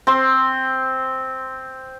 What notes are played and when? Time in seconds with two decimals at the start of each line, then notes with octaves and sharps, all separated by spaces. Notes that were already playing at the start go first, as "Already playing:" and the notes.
0.07 C4 C6